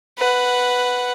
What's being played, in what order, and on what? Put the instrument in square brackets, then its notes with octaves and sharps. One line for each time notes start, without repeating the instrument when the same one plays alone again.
[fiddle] B4 F#5